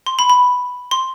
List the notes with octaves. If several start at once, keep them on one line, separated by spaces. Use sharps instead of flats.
C6
B5
B5
C6